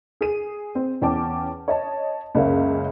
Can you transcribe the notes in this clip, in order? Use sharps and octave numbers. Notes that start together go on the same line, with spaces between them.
G#4 D#7
C4
E2 C#4 G5 A5 D6
C#5 D#5 A5
C#2 F#2 A#3 C#4 E5 F5